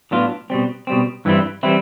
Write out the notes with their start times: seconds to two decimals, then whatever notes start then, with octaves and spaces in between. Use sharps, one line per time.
0.11 A2 F#3 B3 D4 F4
0.50 B2 G3 C4
0.87 B2 G3 C4
1.25 G2 E3 G3 C4 E4
1.63 E3 G3 C4 E4